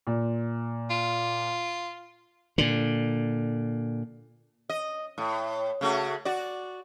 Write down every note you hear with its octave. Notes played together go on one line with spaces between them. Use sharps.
A#2
F4
A#2 D3
D#5
A2
C#3 A3 F#4
F#4 D5